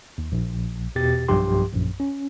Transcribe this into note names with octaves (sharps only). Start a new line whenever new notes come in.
D#2
A#1
E2 B2 G4 A6
B1 G2 F3 G4 C6
A#1 F#2
C#4